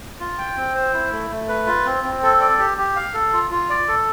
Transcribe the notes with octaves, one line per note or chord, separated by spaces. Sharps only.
F4
G5
C4
C5
E4
A3
A3
B4
F4
C4
C4
A4
D5
G4
G4
F5
A4
F4
F4
D5
A4